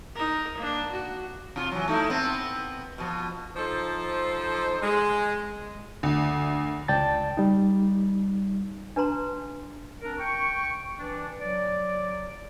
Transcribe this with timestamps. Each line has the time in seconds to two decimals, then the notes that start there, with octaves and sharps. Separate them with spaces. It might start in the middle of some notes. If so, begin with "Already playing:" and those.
0.15 D#4 A#4
0.57 A#3 D4
0.92 F#4
1.56 C3 F4
1.72 E3 F#3
1.88 A3 D#4 E4
2.10 B3 C4
2.98 B2 F3
3.56 F3 D#4 A4 C5
4.82 G#3
6.03 D2
6.88 C#2 D5 G5 A5 A6
7.37 G3 D#4
8.96 D4 B4 A5 A#5 C6
10.02 C4 D4 A#4
10.18 G5 C#6
10.97 E3 D4
11.40 F#3 D5